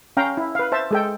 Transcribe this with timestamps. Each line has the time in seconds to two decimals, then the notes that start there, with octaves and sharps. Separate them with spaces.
0.17 C#4 F5 G5 A#5
0.37 E4
0.55 B4 F5
0.72 C5 E5 A5
0.91 G#3 A4 G5